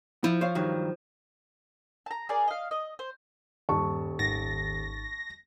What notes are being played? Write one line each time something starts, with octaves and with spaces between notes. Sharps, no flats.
F3 E4
C5 C#5 F5
G2 D#3 F#3
A5 A#5
G#4 A#4 D5
D#5 F5
D#5
C5
D#1 G2 A5 C#6
G#1 D#3 A6 A#6